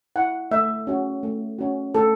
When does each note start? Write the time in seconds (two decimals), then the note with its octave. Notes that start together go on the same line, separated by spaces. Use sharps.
0.16 E4 F#5
0.51 A3 E5
0.87 C#4 F#4
1.23 A3
1.59 C#4 F#4
1.95 A3 A4